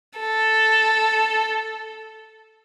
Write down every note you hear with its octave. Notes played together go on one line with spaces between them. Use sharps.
A4